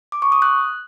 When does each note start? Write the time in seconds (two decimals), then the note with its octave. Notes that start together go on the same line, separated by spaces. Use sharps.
0.12 D6
0.22 C#6
0.32 D#6
0.42 F#6